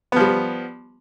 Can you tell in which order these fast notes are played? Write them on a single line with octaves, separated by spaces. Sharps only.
B3 F3 G3